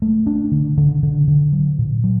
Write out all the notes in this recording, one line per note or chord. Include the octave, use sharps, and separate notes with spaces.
A3
D4
D3
D3
D3
D3
F#3
A#2
F#3